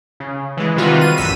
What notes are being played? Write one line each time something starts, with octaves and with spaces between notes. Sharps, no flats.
C#3
E3 G#3
C3 D#3 G3 F4 F#4 B4
D#7
A1 F#2 E6 B6 D#7